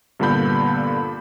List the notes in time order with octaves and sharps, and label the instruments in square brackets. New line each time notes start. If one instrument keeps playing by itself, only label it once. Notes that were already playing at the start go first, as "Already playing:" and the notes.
[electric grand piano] G2 A#2 D3 B3 B5 G6